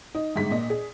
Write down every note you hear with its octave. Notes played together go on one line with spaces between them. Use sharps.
D#4
G1 G#2 B6
A#2 D#5
G#4